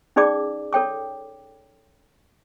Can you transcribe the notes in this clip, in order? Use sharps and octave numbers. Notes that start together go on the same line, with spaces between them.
C#4 D#4 G#4 D5 D6
A4 C#5 G5 D6